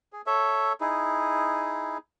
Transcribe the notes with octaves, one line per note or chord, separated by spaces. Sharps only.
G#4
A4 C#5 E5
D#4 E4 G#4